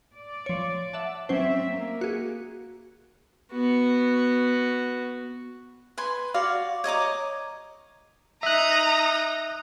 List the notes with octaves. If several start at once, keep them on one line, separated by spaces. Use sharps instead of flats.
D5
F3 C#5
E5 F#5 A5
F#3 C4 C#4 C5 E5
A#3
F#4 G#4
B3 F#4
B4 G#5 C6
F#4 D5 F5
C#5 D#5 A#5 D6
D#4 E5 A#5 D#6 F#6